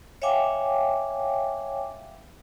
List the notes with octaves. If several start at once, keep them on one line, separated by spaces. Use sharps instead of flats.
C#5 E5 F5 G5 G#5 D6